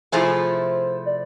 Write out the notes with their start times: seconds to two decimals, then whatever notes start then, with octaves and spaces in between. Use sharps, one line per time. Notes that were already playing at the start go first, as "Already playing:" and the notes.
0.12 C3 F3 A3 E4 G#4 C5
1.06 D5